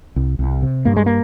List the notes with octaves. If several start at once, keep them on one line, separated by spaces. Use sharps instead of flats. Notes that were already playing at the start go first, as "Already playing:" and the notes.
C2
C2
C3
G2 A#3
G#3
A#3